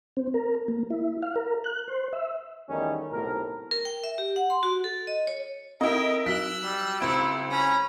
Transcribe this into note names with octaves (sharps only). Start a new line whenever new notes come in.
C4
A#4
A#3
E4
F5
A#4
F#6
C5
E5
E2 D#3 G3 A3 C#4
B1 A2 C3 A#4
A#4
G5
E5
G4
F#5
C6
F#4
A4
D#5
C#5
C4 E4 A#4 D#5 G5
F#3 F#4 E6 F#6 B6 G7
G3
C#2 C4 E4 D7
C#4 A#5 B5